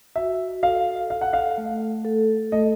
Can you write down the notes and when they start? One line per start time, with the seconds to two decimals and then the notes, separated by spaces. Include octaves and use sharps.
0.16 F#4 E5
0.63 A4 F5
1.10 A4 F5
1.21 F#5
1.33 F5
1.58 A3
2.05 A4
2.52 A3 D#5